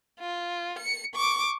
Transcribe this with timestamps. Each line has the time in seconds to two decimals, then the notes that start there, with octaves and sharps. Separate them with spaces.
0.19 F4
0.79 C#7
1.15 C#6 D6